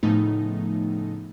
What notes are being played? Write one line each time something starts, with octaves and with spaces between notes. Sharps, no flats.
A2 C#3 F3 A3 B3 D#4